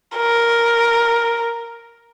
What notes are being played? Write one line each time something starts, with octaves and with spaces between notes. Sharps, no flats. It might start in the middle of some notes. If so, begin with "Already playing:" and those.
A#4